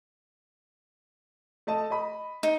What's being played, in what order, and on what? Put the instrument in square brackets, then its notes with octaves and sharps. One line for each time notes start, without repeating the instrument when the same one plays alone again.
[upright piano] A3 D#5 A5
D#5 B5
[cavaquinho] D#4